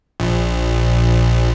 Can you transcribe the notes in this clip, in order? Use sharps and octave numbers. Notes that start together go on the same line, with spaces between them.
A#1